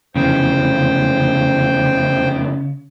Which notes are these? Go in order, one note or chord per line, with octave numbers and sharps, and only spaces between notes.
F1 E2 C#3 C5 G5